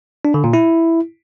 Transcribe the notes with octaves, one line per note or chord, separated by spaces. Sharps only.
D4
D3
A#2
E4